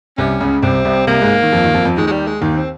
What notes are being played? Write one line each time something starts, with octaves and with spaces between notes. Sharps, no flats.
C2 C3 C#4
C#2 C#3
C2 C3 C4
C2 C3
C2 C3 A#3
G#2 G#3
D#3
F2 F3
D#2 D#3
F2 F3
F2 F3
D#2 D#3 G#3
G#3
G3
G#3
D#2 D#3 A#3
C4